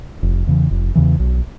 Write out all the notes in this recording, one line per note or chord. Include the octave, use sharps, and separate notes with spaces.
F1
E2 C#3 E3
F1
E2 C#3 E3
B1